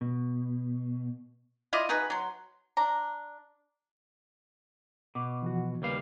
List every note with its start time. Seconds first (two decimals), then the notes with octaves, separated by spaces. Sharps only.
0.01 B2
1.73 E4 F4 D5 D#5
1.89 D#4 F#4 G#4 B4
2.10 F#3 C6
2.77 D4 A#5
5.15 B2 D6
5.42 E3 F3 F#4
5.82 D#2 C#3 G3 B4 F5 F6